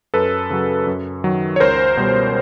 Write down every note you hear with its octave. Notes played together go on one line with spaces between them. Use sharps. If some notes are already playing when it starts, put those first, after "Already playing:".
F#2 A4 B4
C#3 F#3
F#2
D#3 F#3
C#5
C#2 A#4 C5
B2 G3